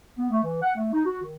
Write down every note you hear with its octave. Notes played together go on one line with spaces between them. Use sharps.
B3
A3
E3
F#5
A3
D#4
F#4
D#3